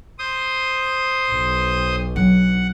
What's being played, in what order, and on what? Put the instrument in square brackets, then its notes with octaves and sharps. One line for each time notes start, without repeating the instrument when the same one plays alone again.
[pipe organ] C5 D#6
[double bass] B1
[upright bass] F#3 D4 [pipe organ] F#5